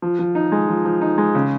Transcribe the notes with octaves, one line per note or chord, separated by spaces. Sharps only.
F3
F3
D#4
G#3
F3
F3
D#4
G#3
C#3